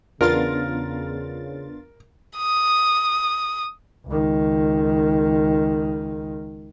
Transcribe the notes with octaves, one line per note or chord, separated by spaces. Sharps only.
E2 C#3 B3 D4 F4 A#4 A6
D#6
C#2 D#3